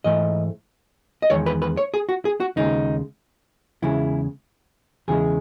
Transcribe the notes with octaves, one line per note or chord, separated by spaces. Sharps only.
G#2 E3 A3 D#5
D#5
E2 D#3 G#3 C#5
B4
B4
C#5
G#4
F#4
G#4
F#4
D#2 C#3 G#3 D#4
E2 C#3 G#3 E4
E2 C#3 E3 G#3 G#4